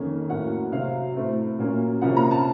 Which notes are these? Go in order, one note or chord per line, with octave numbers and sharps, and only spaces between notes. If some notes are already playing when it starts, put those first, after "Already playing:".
Already playing: F2 D#3 A#3 C#4
A2 F#3 A#3 C#4 F#5
C3 F#3 C4 F5
A2 A3 C4
A#2 F#3 A#3 C#4
C3 F3 A#3 C#4 F#5
A#5
A5